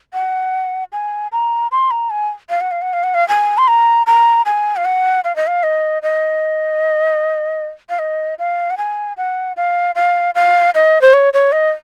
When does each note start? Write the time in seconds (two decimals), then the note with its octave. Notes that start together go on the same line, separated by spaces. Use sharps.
0.13 F#5
0.92 G#5
1.32 A#5
1.71 C6
1.91 A#5
2.10 G#5
2.50 F5
2.61 F#5
2.71 F5
2.82 F#5
2.93 F5
3.03 F#5
3.14 F5
3.28 G#5
3.58 C6
3.68 A#5
4.06 A#5
4.46 G#5
4.76 F5
4.85 F#5
5.24 F5
5.36 D#5
5.47 F5
5.63 D#5
6.02 D#5
7.89 F5
7.99 D#5
8.39 F5
8.70 F#5
8.78 G#5
9.17 F#5
9.56 F5
9.95 F5
10.35 F5
10.75 D#5
11.01 C5
11.13 C#5
11.33 C#5
11.52 D#5